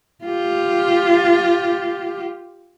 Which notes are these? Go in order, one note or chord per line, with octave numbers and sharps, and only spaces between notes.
F4 G4